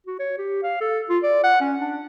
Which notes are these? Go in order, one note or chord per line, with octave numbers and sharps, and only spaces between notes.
F#4
C#5
G4
F5
A4
F4
D5
F#5
C#4
D4